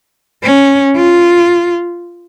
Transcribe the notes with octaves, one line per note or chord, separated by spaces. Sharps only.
C#4
F4